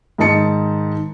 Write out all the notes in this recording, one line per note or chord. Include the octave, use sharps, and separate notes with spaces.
G#2 D#3 D#5 A5 C#7